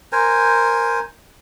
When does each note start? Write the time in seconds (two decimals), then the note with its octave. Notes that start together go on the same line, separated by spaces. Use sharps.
0.12 A#4 C5 G#5